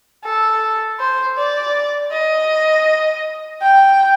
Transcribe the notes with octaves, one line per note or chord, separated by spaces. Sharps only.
A4
C5
D5
D#5
G5